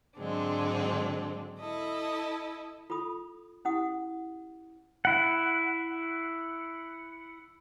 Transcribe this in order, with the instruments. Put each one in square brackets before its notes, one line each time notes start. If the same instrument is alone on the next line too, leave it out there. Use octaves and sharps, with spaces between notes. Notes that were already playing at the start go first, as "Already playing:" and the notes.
[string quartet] G#2 D3 F#3 G#3 C4 D4
E4 A4 D#5
[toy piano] F4 A4 B5 D#6
C#4 E4 G4 F#5 D#6
[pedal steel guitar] E4 F#5